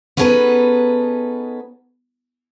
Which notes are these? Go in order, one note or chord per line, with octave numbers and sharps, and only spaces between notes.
B3 C#4 D#4 G#4 A4 B4